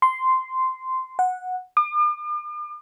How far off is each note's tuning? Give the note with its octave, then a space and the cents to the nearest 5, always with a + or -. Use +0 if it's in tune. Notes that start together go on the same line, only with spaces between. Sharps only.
C6 -10
F#5 -10
D6 +45